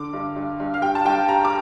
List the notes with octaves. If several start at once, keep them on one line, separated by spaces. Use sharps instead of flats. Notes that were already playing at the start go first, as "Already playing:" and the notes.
Already playing: D3 D6
G2
G2
G2
F5
G3 G5
A5
G2 G5
G3 A#5
D6